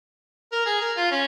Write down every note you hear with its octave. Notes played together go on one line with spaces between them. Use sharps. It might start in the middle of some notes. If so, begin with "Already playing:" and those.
A#4
G#4
A#4
F4
C#4